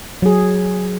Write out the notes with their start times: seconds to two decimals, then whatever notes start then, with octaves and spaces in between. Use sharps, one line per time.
0.22 F#3 G#4